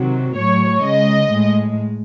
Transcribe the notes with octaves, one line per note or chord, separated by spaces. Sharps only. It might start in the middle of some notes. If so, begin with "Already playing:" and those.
Already playing: C3 D#3 F#3
A2 F#3 C#5
C#3 G#3 D#5
A2 G#3